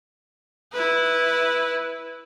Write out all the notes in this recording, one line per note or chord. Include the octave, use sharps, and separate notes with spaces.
E4 B4